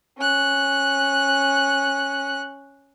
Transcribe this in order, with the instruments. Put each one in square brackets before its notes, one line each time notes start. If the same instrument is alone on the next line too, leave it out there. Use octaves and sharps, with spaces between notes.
[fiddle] C#4 F#6